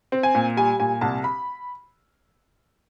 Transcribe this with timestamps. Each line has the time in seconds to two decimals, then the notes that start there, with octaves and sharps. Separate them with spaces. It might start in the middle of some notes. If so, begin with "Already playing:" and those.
0.12 C4
0.23 G#5
0.35 A#2
0.57 G3 G#5
0.80 A#2 G#5
1.01 C2 A5
1.24 B5